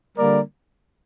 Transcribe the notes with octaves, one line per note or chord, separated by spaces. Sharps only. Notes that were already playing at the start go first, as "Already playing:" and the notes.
D3 G3 A#3 A#4 D5